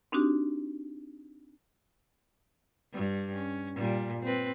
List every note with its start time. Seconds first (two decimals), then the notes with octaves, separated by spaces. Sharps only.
0.12 C4 D4 D#4 F#4 G4
2.92 G2 G3
3.34 C#4
3.75 A#2 G3
4.22 C4 B4